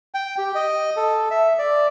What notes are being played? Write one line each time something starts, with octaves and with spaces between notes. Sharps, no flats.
G5
G4
D#5
A4
E5
D5